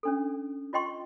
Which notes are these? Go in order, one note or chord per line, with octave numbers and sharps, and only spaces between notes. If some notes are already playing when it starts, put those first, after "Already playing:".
C#4 D4 A4
F4 D#5 G5 C6 C#6